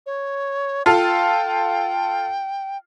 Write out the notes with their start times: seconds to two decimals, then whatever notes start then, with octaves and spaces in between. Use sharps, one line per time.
0.06 C#5
0.86 F4 A4 F5 G5